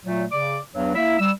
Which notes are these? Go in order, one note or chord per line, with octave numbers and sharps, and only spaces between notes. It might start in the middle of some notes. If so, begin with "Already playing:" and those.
A#2 F#3 A3
C#3 D5 D6
E2 G2 F#3
A#3 E4 E5
G3 E6